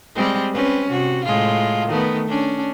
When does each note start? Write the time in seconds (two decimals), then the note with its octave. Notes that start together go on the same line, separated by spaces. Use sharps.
0.15 G3 G#3 C4
0.53 C4 C#4 B4
0.90 C3 F#4
1.25 A2 G#3 F4
1.88 D#3 A3 B3
2.29 C#4 D4